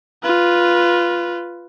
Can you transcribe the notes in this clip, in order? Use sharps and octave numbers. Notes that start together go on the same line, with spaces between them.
F4 B4